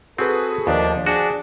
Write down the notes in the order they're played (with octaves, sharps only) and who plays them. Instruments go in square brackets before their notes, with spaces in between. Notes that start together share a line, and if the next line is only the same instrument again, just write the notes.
[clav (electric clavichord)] C4 [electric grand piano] F#4 G#4 B4 [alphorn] A4
[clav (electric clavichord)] D#2 [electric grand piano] F3 [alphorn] A3 [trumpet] D4
[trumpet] D4 [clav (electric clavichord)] F#4 [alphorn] G#4